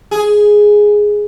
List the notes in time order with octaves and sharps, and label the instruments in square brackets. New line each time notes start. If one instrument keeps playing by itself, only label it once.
[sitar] G#4